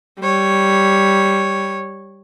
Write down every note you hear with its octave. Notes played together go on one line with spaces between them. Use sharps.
G3 C#5